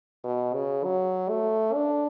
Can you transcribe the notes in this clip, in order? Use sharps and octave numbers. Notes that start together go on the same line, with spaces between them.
B2
C#3
F#3
A3
D4